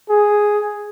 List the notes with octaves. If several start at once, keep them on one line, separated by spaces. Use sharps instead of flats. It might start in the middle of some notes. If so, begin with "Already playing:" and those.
G#4